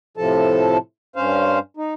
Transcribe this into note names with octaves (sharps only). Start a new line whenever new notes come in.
A2 C3 F3 A4 A5
G2 C#4 C5 F5
D#4